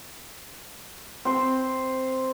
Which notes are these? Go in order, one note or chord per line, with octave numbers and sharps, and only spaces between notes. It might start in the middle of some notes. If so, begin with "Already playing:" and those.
C4 C5